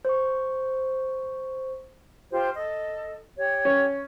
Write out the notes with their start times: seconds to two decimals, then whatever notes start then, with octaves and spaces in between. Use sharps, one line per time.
0.05 C5 C#6
2.31 F4 G4 C5
2.55 A4 D#5
3.37 G4 C#5
3.65 C#4